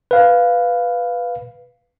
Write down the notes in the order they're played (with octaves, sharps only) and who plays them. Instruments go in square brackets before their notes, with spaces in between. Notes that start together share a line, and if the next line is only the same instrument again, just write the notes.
[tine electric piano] B4 F5